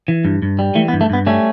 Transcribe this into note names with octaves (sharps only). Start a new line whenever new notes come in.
E3
G2
G2
G3
E3 A3
B3
G2
A3
G2 B3
G3 A3 C#4